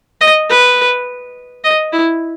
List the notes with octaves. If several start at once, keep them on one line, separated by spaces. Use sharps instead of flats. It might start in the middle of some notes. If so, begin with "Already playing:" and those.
D#5
B4
D#5
E4